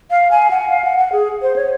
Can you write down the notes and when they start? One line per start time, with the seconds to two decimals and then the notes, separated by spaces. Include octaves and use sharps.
0.11 F5
0.31 G#5
0.51 F#5
0.70 F5
0.84 F#5
0.98 F#5
1.12 G#4
1.42 C5
1.56 C#5